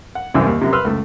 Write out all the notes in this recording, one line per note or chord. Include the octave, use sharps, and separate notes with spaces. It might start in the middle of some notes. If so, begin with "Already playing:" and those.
F#5
C2 F#2 E3 C4 E6
D#2
F#2 C3
B4 C6 E6 F6
C#2 A3